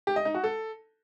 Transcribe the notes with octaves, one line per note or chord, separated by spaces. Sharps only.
G4
D#5
D#4
F#4
A4